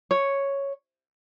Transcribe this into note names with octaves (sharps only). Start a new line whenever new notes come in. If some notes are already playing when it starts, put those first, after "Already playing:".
C#5